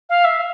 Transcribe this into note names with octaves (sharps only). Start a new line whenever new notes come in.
F5
E5